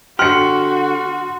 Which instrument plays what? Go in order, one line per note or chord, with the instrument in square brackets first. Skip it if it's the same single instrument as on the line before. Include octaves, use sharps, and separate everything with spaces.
[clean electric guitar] D3 G4 [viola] F#4 [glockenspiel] C6 [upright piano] F6 C#7